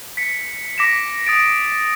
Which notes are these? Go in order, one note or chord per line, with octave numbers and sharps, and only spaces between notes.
B6 C#7
D6 A#6 B6 D7 E7
D#6 A6 D7